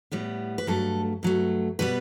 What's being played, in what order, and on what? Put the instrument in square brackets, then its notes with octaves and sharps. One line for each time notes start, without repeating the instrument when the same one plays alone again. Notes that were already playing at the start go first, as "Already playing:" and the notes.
[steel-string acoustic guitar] A2 G3 B3
B4
G2 F#3 A3 A4
G2 F#3 A3
B2 G3 B3 B4